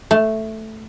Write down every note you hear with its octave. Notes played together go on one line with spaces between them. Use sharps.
A3